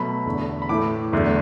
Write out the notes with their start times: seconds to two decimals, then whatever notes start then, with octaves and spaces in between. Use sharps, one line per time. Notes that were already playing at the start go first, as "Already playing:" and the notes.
Already playing: B2 F#3 A3 B5
0.26 E2 D3 A3
0.62 B5
0.69 A2 E3 A3 D6
1.12 E2 D3 F#3 A3